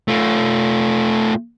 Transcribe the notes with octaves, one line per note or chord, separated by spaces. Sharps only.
A3 F4